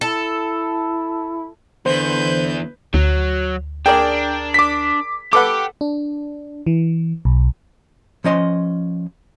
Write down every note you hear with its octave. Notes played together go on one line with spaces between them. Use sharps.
E4 A4
E2 D3 B4 C5 G6
D2 F#3
D4 G#4 A#4 D5 G5
D6 B6
G4 A4 B4 F#5 D6
D4
E3
B1
F3 C#4 D#5 C6